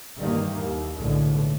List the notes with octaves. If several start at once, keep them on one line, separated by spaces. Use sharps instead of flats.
G2 D#3 E3 G3 A#3
D#2
B1 A2 D3 G#3